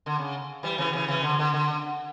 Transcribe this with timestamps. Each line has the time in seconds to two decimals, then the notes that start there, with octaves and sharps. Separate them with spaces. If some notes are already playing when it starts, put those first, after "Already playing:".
0.06 D3
0.19 C#3
0.63 E3 G3
0.78 C#3 E3
0.93 C#3 E3
1.08 C#3 E3
1.23 D3
1.39 D3
1.53 D3